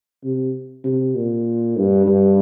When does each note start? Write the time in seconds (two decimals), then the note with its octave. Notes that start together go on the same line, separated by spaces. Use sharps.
0.24 C3
0.84 C3
1.15 A#2
1.77 G2
2.07 G2